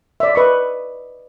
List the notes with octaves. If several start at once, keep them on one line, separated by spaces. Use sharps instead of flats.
D5 E5
B4 D#5 C#6